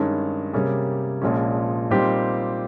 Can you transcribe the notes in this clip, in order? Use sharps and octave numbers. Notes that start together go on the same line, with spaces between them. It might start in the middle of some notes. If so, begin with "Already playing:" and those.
Already playing: G2 D#3 G#3 C#4
C3 G3 A#3 C#4 G#4
A#1 A#2 F3 G#3 C#4
A#2 G3 C4 D#4 G4